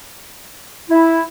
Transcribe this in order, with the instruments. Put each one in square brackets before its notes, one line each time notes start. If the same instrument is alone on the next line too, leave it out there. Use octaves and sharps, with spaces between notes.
[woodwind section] E4